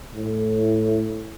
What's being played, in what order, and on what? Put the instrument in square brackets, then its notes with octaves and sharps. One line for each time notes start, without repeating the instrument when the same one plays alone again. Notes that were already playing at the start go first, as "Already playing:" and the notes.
[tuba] A2